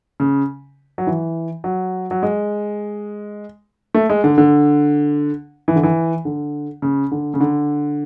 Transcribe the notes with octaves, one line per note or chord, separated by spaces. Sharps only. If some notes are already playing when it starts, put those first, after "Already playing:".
C#3
F#3
E3
F#3
F#3
G#3
A3
G#3
D3
D3
E3
D3
E3
D3
C#3
D3
C#3
D3